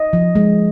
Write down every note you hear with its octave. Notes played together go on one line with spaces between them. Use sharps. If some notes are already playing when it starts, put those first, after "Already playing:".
Already playing: D#5
F3
G#3